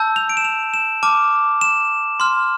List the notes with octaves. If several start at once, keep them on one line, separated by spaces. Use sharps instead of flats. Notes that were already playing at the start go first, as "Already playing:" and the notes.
Already playing: A5 E6 G6
F7
D7
E7
F7
E7
A5 D6 F6
E7
C6 F6